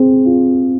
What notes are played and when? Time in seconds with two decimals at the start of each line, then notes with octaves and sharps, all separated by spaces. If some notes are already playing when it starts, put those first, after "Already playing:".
Already playing: C4 G#4
0.25 F4